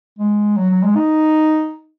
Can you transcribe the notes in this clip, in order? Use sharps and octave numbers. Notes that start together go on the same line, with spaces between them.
G#3
F#3
F#3
G#3
D#4